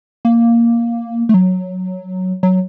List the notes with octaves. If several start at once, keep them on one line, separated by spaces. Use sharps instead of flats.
A#3
A3
F#3
F#3